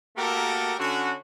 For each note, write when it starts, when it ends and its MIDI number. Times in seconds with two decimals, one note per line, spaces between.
0.17 0.74 57
0.17 0.74 58
0.17 0.74 66
0.17 0.74 67
0.17 0.74 69
0.17 0.74 70
0.79 1.13 50
0.79 1.13 61
0.79 1.13 62
0.79 1.13 66